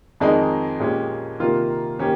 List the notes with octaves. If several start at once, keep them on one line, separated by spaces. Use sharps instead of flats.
F2 D#3 G#3 D#4
A#2 G#3 C#4 G4
C3 D#3 A#3 F4
D#3 A#3 C#4 G4